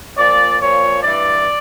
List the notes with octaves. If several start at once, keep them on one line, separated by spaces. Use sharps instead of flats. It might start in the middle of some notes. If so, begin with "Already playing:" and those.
A#2 F3 D5
A#2 F3 C#5
G2 E3 D5